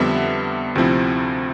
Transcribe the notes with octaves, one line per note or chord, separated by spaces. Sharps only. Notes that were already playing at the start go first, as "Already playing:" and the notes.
Already playing: F2 D3 G3 B3 E5
D2 C3 F3 C4 E4